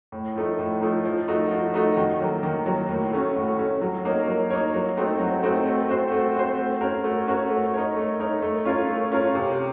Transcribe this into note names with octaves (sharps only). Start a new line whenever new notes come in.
A2
F3 A3 D#4
A2
F3 A3 D#4
F3
A3 D#4 F#4
F3
A3 D#4 F#4
D#3
F#3 A#3
D#3
F#3 A#3
A2
A3 C#4 F#4
A2
A3 C#4 F#4
F#3
A#3 D#4 A#4 C#5
F#3
A#3 D#4 A#4 C#5
F#3
A3 C4 D#4 F#4
F#3
A3 C4 D#4 F#4
A3
C4 F#4 C5
A3
C4 F#4 C5
A3
C#4 F#4 A#4 C#5
A3
C#4 F#4 A#4 C#5
A3
D#4 A#4 C#5
A3
D#4 A#4 C#5
A3
C#4 F4 A#4 C#5
A3
C#4 F4 A#4 C#5
C3